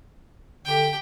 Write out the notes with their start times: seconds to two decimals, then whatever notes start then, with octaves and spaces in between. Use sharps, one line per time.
0.65 D3 G4 G5